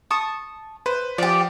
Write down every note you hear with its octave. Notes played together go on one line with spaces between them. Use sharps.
A5 C#6 D#6
B4 C5
F3 G4 D5